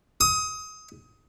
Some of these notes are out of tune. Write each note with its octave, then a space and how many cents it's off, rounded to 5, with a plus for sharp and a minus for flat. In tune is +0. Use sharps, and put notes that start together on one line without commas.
D#6 +25